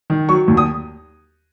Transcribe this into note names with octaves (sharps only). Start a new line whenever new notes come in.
D#3
F#3 C#6
D#2
D#6